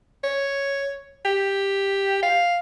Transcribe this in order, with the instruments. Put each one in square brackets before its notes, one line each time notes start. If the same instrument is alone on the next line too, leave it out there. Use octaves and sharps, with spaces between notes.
[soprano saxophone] C#5
G4
F5